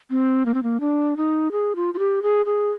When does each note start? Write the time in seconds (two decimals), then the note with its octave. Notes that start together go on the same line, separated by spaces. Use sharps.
0.10 C4
0.46 A#3
0.54 C4
0.63 A#3
0.80 D4
1.17 D#4
1.52 G#4
1.76 F4
1.94 F4
1.99 G4
2.23 G#4
2.46 G#4